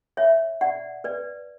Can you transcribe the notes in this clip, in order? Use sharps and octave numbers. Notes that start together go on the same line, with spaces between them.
C#5 E5
D5 F#5
B4 D5